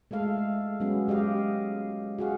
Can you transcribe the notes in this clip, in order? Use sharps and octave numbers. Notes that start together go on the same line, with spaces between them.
G#3 A3 A4 F5
F#3 G#3 B3 C#4
G#3 G4 D#5 F5
F#4 G#4 F5